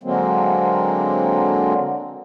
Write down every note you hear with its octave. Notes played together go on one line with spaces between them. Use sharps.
D3 F#3 G#3 A#3 C4